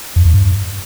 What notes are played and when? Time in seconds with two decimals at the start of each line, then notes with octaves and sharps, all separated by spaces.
0.16 F2
0.25 E2
0.34 G2